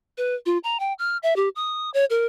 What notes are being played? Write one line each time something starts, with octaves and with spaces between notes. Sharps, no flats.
B4
F4
A#5
G5
F6
E5
G4
D#6
C#5
A#4